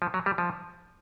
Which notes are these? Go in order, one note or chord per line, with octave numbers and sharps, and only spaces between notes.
F3
F#3
G3
F3